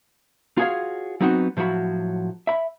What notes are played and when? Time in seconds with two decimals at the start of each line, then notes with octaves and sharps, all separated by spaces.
0.58 F4 F#4 G#4 A4 C#5 F5
1.21 F#3 B3 C4 D#4 F#4
1.57 A2 F3 F#3 F#4 B5
2.47 E5 B5